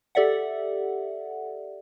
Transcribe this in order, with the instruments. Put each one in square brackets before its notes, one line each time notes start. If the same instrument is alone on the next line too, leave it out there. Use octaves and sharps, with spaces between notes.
[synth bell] G4 A4 D5 E5 F#5